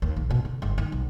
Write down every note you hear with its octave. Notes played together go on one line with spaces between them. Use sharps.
D#2
A#1
B2
D3
F#1
D#3
B1